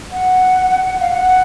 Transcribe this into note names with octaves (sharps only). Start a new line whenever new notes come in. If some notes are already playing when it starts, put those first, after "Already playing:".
F#5
F#5
F5
F#5